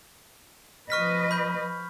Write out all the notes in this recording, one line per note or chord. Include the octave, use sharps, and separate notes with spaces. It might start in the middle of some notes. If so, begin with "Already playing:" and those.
F3 B4 D#5 C#6 F6 B6
B5 G6